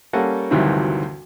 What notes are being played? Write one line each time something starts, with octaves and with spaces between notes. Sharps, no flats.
G3 A#3 C#4 A4 F#5
D2 G2 C3 D#3 E3 F#3